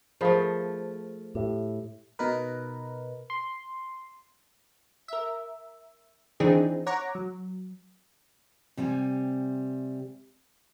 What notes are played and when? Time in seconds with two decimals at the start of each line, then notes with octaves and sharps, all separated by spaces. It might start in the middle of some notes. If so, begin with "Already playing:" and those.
0.21 F3 A3 G#4 A#4 C5 F5 B5
1.35 A2 G4
2.19 B2 D#4 A#4 B4
3.30 C6
5.08 A#4 E5
6.40 D#3 E3 C4 D4 D#4 G#4
6.86 C#5 F#5 A#5 D6
7.15 F#3
8.77 C3 G3 G5 G#5